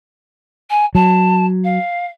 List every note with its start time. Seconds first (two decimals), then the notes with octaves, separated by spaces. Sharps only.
0.70 G#5
0.95 F#3 A5
1.64 F5